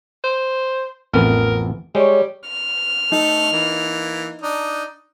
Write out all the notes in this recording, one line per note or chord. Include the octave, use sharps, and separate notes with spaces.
C5
A1 F2 B3 A#4
G3 G#3 C#5
F6
A3 D#4 A4
E3 A#3
D4 D#4